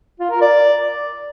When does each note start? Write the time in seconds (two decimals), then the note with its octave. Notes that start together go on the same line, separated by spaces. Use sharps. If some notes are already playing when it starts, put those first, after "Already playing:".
0.20 F4
0.31 A#4
0.41 D5